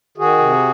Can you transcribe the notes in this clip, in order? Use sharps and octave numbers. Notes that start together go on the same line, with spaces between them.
D#3 F#4 G#4
C3